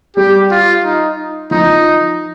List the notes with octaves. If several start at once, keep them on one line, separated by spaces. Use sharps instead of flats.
G3 G4
F4
D#4
F3 D#4